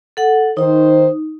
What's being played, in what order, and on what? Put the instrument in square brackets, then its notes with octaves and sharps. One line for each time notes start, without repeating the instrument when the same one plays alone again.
[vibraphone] A4 F#5
[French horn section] D#3 C5 [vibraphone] D#4